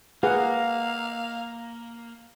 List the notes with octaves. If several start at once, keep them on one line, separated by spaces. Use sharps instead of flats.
A#3 G#4 B4 F5 F#5